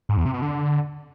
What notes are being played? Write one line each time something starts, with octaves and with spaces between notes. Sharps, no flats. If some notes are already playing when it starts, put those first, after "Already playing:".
G#2
E2
C3
B2
D3